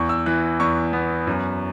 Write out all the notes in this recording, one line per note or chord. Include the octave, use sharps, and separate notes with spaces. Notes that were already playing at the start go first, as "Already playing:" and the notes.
Already playing: E2 C#6
E6
E3 F#6
E2 C#6
B3
F#2